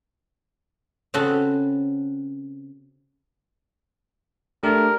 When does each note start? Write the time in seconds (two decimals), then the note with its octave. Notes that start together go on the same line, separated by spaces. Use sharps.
1.14 C#3 C4 C#4 F#4 A4 B4
4.63 A3 D4 G4 A#4